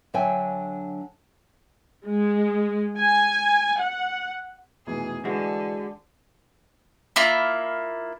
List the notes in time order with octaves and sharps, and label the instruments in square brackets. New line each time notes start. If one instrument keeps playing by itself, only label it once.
[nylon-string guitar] D3 F#3 D4 E5 G5 G#5
[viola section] G#3
G#5
F#5
[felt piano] F1 B2 E3 [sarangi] G#4
[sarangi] D3 [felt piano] E3 [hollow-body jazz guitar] G#3 F#4
[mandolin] A#3 E4 F4